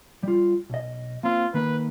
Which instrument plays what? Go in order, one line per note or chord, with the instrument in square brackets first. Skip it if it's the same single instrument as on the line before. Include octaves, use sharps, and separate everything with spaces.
[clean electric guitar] G3 F4
B1 D#5
[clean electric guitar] A#3 C4 [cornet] F4
[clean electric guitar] D#3 A#3 [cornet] B4